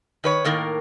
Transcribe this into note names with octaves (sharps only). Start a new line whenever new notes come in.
D#3 B4 C#5
A2 D#3 A#3 A#4